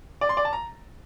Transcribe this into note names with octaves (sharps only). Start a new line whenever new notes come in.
D5
C6
D5
A5
A#5